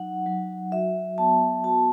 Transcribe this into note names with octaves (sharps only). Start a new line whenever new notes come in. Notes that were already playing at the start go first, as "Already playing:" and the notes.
Already playing: F#3 D#4 F#5
F#3
F#4 E5
B3 A5
F#4 A5